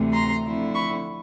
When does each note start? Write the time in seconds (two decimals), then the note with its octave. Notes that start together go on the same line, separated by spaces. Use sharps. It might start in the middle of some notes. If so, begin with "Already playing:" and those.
Already playing: D2 C3 E3 A3
0.13 A#5 C6
0.45 D3 F3 A3 C4 E4
0.75 B5 C#6